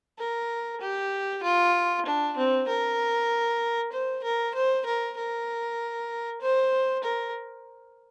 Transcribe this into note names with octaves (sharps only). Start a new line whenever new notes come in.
A#4
G4
F4
D4
C4
A#4
C5
A#4
C5
A#4
A#4
C5
A#4